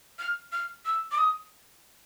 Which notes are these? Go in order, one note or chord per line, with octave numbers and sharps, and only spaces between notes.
F6
F6
E6
D6
D#6